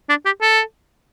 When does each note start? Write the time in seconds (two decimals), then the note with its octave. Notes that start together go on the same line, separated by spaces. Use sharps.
0.09 D4
0.25 G4
0.41 A4